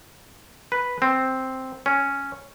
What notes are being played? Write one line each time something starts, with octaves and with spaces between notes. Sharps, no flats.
B4
C4
C#4